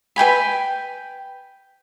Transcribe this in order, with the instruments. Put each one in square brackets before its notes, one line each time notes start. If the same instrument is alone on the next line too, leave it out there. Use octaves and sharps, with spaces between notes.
[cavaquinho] B4 G5 G#5 B5